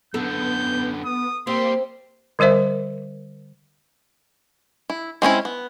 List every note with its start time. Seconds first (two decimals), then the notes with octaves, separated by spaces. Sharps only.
0.14 F#2 D3 B3 A4 G6
1.05 D#6
1.47 G3 A#3 C4 C6
2.39 D3 G3 A#4 C5 E5
4.90 E4
5.22 G#3 C4 C#4 E4
5.45 B3